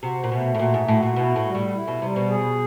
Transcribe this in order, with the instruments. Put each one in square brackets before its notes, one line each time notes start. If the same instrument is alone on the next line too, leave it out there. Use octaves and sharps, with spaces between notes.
[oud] C3 [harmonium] F#4
[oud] A#2
[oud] B2 [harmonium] A3
[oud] A2
[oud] A#2 [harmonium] F#4
[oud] G#2
[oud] A2 [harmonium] F#4
[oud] A#2
[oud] B2 [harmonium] E4
[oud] A2
[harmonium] G3
[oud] A2
[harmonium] E4
[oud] B2
[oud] C3 [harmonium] G3
[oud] B2
[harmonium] G#4